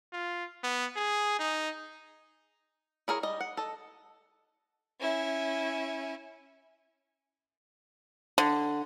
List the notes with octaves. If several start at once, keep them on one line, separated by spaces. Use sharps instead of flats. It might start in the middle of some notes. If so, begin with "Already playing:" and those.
F4
B3
G#4
D#4
E4 G#4 A#4 C#5
G3 D#5
F#5
A4 D#5
C#4 E4
D3